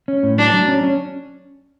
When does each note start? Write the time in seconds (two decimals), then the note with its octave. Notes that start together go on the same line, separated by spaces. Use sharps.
0.08 C#4
0.23 A2
0.38 F#3 D4
0.54 F#3
0.68 C#4
0.83 C#4